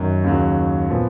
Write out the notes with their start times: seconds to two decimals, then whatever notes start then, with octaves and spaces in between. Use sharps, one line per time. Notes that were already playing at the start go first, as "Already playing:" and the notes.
Already playing: F#2 D#3 F#3
0.24 D#2 C#3 F#3
0.90 A#2 F3 B3